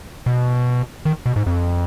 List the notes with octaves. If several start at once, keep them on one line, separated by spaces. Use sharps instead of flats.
B2
D#3
B2
G#2
F2